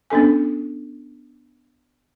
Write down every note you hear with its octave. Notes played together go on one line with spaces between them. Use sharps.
B3 C#4 D4 A4 G#5